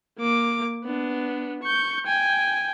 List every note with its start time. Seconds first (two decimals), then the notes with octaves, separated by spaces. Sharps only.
0.19 A#3 D6
0.84 B3 D4
1.63 C#6 G6
2.06 G5 G#5